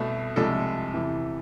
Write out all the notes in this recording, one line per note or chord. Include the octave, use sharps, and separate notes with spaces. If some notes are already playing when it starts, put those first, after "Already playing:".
Already playing: C2 B2 A3
C2 C3 F3 G#3 A4
E2 C3 E3